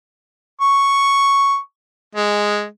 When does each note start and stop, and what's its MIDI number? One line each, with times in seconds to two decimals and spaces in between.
0.61 1.57 85
2.15 2.64 56